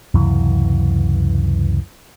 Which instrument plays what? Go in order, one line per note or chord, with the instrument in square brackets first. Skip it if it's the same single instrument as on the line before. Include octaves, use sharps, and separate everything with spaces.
[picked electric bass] C#2 F#2 C3 E3